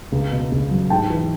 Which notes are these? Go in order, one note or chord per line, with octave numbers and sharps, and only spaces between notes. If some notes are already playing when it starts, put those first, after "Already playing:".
C#2
B2
C#2
F#3
G#2 G5 A5
E3